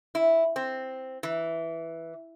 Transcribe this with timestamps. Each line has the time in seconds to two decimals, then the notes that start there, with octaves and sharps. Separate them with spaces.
0.15 E4
0.56 C4
1.23 E3